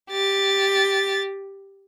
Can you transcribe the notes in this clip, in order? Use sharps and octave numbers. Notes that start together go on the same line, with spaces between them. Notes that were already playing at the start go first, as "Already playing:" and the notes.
G4 A6